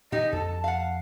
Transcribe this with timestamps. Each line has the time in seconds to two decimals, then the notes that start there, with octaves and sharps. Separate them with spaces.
0.12 A#2 E3 D#4 G4 D#5
0.33 F2 F3 A#3 A4 A5
0.64 F5 F#5